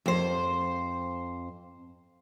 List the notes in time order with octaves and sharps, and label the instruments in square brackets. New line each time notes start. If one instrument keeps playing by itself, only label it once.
[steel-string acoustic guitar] F2 C5